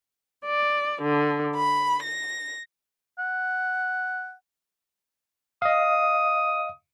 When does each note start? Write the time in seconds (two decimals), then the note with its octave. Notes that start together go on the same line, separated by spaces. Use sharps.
0.45 D5
1.01 D3
1.56 B5
2.03 A#6
3.19 F#5
5.62 D#5 F5 D#6